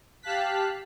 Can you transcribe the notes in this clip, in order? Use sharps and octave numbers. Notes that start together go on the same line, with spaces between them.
G4 F5 A5 F#6 B6